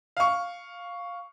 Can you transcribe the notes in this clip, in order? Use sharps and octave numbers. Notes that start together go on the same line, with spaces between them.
F5 C#6